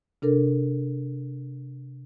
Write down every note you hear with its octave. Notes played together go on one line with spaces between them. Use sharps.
C3 D4 A4 A#4